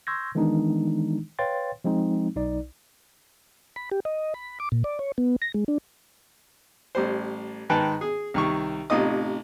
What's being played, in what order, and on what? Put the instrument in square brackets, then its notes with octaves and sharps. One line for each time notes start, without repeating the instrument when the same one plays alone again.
[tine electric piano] C6 C#6 E6 G6 G#6 A#6
D#3 E3 G#3 B3 D4 D#4
B4 C#5 F5 G5 C6 A6
F3 G#3 C4 D#4
B1 D#4 D5
[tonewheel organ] B5
G4
D#5
B5
D6
A#2
D5
C#5
B3
A#6
G#3
D4
[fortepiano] A1 G3 C5
G#2 D#3 B4 G5 A5
G#4
C2 D#3 C#6
A1 C3 D#4 F4 D#5 D#6